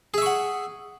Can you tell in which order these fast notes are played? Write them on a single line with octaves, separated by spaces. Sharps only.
G#4 E5 C#6 F#5